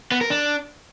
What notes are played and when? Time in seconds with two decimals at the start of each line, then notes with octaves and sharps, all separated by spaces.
0.12 B3
0.21 A#4
0.30 D4